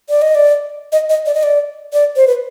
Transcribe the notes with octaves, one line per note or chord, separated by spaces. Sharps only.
D5
D#5
D5
D#5
D#5
D5
D#5
D5
D5
C5
B4